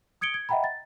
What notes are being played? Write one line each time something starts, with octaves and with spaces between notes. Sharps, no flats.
D#6 G#6 C#7 D7 G7
G#6
D#5 E5 F#5 G5 A#5 B5
A6